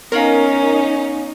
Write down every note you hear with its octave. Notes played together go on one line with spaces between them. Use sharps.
B3 C#4 D#4 A#4 C#5 F5